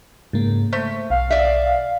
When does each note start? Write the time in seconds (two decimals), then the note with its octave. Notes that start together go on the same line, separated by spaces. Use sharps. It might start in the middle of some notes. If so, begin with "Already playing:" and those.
0.33 G#2 C#3 A#3
0.73 A3 C5 B6
1.10 B1 F5
1.30 D5 E5